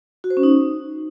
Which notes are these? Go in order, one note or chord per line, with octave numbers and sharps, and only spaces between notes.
F#4
C5
C#4
D#4